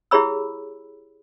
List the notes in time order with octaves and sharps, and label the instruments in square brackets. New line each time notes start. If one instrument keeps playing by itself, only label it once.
[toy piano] E4 G4 G#4 C#5 B5 E6